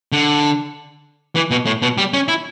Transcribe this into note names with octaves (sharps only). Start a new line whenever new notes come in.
D3
E3
B2
A2
B2
G3
C#4
E4